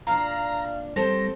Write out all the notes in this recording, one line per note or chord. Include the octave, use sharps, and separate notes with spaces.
A#2 D4 F5 A#5
G3 C4 A4 C5 A#6